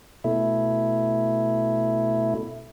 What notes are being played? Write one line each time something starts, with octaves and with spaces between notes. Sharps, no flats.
B2 A3 E4